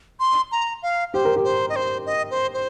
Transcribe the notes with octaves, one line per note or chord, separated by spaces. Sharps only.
C6
A#5
F5
G4 C5
A#4
G4
C5
D#5
C5
D#5
C5
C5